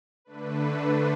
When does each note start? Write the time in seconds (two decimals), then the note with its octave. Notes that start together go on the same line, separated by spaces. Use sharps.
0.25 D3 A3 D4 B4
0.82 C5